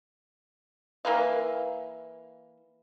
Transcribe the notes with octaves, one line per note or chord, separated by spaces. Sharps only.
E3 A#3 B4 F5